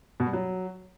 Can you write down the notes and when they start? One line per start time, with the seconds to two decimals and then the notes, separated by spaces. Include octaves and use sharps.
0.20 B2
0.27 G3
0.33 F#3